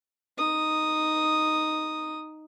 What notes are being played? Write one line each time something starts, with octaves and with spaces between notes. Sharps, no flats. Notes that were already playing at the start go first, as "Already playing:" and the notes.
D#4 D#6